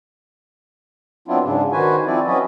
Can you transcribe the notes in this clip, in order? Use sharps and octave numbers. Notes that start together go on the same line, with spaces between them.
F#3 B3 C4 D4 E4 F4
G#2 C#3 D4
D#3 F#4 B4 C5 G#5
F3 C4 E4 D5
F#3 C#4 F#4 B4 D#5